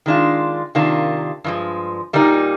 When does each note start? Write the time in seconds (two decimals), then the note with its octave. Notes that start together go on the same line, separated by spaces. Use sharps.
0.06 D#3 G#3 D4 F4
0.75 C3 D#3 A#3 D4 F4
1.44 G2 F3 G#3
2.13 A#2 G3 A#3 D#4